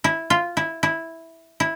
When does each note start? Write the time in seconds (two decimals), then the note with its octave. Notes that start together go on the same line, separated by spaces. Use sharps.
0.04 E4
0.30 F4
0.57 E4
0.83 E4
1.60 E4